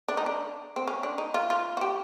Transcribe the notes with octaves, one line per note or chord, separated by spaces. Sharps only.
D4
D#4
D4
C4
C#4
D4
D#4
F4
F4
F#4
G4